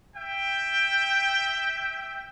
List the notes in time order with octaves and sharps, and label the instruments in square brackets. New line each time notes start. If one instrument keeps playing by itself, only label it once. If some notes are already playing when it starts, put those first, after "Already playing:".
[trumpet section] E5 G5